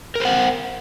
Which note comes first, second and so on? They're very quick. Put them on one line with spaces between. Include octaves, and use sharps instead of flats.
A#4 C5 F#5